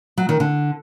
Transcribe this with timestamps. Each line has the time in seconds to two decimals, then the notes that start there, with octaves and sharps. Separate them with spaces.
0.18 F#3
0.29 D#3
0.40 D3